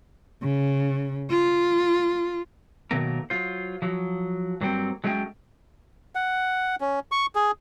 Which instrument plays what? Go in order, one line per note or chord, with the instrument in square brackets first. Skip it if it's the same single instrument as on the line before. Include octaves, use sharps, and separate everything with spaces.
[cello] C#3
F4
[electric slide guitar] B2 D#3 F#3 A3 A#3 A#4
F#3 F4 C5
F3 F#3
G2 F#3 G3 A#3 C4 G5
F#3 G#3 A3 C#4 D5 G5
[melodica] F#5
C#4
C#6
G#4